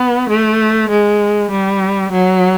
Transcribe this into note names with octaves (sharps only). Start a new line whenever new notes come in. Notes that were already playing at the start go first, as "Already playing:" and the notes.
Already playing: B3
A3
G#3
G3
F#3